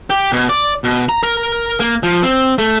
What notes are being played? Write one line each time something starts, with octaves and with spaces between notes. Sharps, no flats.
G4
B2
D5
B2
A#5
A#4
A#3
F3
C4
A3